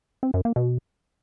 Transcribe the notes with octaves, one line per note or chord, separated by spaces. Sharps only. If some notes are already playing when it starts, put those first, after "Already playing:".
C4
F#2
A#3
B2